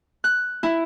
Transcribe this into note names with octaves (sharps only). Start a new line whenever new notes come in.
F#6
E4